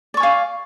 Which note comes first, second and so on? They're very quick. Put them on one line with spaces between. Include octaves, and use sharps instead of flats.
D5 C#6 G#5 F5